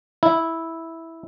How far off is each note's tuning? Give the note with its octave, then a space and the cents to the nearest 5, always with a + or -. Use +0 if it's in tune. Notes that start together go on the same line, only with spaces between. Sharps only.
E4 -10